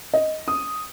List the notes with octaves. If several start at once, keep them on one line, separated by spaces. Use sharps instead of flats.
D#5
D#6